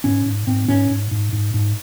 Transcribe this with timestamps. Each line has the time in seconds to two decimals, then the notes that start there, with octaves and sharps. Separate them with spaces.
0.04 G#2 C#4
0.26 G#2
0.47 G#2 C4
0.68 G#2 C#4
0.90 G#2
1.11 G#2
1.33 G#2
1.54 G#2